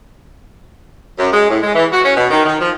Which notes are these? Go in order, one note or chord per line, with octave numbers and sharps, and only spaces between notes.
F#2
G#3
A2
G#3
E3
F#4
C#4
B2
D#3
D#3
F3